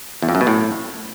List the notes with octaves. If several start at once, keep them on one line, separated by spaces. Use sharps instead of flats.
E2
F2
F#2
B2
A2